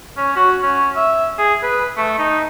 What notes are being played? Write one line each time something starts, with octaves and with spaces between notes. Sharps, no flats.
C#4
F#4
C#4
E5
G#4
B4
A3
D#4